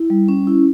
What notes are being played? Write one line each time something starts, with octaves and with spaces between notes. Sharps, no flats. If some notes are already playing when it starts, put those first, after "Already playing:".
Already playing: E4
G3
C#4
E4